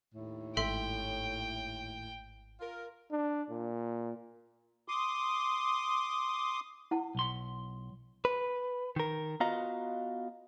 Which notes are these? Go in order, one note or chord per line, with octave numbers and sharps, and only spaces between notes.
D#2 A2
G#1 A4 E5 G5 C6
F4 A#4
D4
A#2
C6 D6 D#6
E4 F#5 A5
B1 C6
B4
D#3 A#4
B3 F4 F#4 D#5 F5 A#5